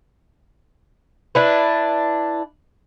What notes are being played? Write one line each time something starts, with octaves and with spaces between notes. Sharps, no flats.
D4 E4 B4